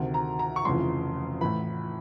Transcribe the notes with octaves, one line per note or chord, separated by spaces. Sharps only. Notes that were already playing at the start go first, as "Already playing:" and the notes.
Already playing: D2 C3 D#3
A#5
A#5
C#6
F1 F2 C#3 E3 C6
A2 E3 B5